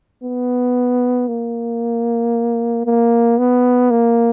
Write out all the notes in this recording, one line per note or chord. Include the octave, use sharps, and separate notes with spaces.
B3
A#3
A#3
B3
A#3